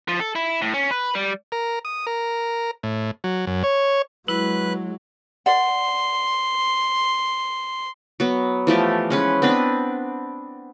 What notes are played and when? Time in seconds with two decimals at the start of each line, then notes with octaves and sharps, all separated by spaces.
0.08 F3
0.20 A4
0.35 E4
0.61 A2
0.74 C#4
0.91 B4
1.15 G3
1.52 A#4
1.85 D#6
2.07 A#4
2.83 A2
3.24 F#3
3.47 F#2
3.63 C#5
4.28 F#3 G#3 E4 B4 F#6
5.46 A#4 D5 F#5 C6
8.20 F#3 B3
8.67 E3 F3 A3 G4
9.10 G#3 C#4 B4
9.42 B3 C4 D4 B4